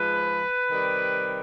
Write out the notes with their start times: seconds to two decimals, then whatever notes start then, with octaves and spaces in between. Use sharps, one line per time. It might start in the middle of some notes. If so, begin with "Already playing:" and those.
Already playing: G#2 F3 G#3 B4
0.69 C3 D#3 G3